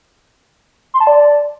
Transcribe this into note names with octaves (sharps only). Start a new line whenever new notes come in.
C6
A5
D5